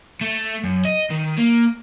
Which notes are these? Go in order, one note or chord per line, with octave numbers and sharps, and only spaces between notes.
A3
F#2
D#5
D#3
A#3